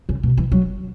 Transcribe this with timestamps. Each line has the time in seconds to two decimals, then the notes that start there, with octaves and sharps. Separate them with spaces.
0.09 C#3
0.23 B2
0.37 E3
0.52 F#3